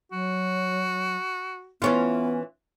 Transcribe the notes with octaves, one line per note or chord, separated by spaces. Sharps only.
F#3 F#4
E3 B3 C#4 F4